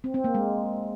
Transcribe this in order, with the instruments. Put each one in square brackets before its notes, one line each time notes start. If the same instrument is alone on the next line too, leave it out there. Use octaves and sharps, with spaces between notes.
[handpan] C4
C4
A#3
G#3